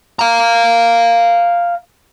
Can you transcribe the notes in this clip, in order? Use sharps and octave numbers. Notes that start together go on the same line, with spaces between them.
F5 A#5